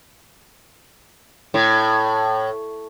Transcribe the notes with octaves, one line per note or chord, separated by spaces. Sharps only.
A2